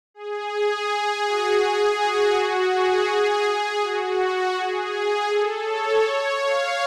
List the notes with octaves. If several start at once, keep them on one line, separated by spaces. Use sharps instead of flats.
G#4
F#4
G#4
F#4
G#4
G#4
F#4
G#4
A4
C#5
F5